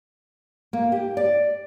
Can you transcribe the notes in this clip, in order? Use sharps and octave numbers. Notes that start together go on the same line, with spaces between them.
A#3
G4
D5